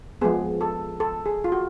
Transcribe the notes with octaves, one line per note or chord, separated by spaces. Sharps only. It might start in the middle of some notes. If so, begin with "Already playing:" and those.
F3 G#3 B3 G#4
A4
A4
G#4
F4
F#4